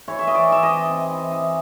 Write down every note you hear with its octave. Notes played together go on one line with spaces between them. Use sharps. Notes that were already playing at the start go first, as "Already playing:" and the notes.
E3 C#5
E5
E3 D#5
D5
E3 E5
D#5
C3
C3
E3
E3